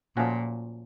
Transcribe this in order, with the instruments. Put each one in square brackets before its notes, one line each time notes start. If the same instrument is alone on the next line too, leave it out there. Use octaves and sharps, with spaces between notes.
[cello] A#2 [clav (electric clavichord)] F3 A3 C#4 F#4